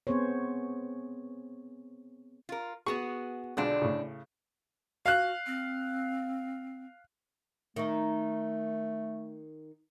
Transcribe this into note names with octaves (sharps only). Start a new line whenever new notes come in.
B3 C4 G#4 C5 C#5
F4 A#4
B3 F#4 G#4 C#6
B1 D3 G#3 C4 D4 F4
A2 C#3
F#4 F5 F#6
C4
D#3 A3 D#4